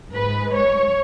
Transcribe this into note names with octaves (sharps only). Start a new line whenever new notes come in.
G#2 G#3 B4
C#5